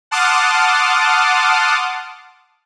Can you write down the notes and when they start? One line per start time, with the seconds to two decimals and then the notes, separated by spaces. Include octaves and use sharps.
0.11 F#5 A5 C6 D6 D#6 F6